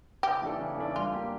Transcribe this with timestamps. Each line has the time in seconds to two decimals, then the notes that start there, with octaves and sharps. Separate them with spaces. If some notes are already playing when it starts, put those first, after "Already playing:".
0.23 C#3 G4
0.42 E3 A3 D4 A4
0.60 C#3
0.78 E3 A3 D4 A4
0.95 G3 F4
1.13 A#3 D4 G4